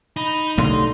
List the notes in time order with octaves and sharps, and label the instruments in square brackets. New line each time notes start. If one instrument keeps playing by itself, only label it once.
[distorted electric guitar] D#4 [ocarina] B5
[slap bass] B1 A2 G3 [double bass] D3 [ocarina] C6